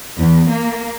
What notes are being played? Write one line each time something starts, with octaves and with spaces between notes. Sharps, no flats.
E2
A#3